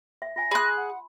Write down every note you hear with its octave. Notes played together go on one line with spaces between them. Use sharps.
E5
F4 G#5 A#6
G#4 B5 C6 F#6
F#5